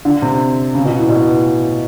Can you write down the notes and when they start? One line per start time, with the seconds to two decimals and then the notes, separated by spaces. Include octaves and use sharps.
0.05 D3
0.22 C3
0.75 C#3
0.85 B2
0.98 A2
1.09 B2